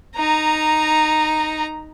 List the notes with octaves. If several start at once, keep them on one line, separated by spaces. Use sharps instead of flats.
D#4 A#5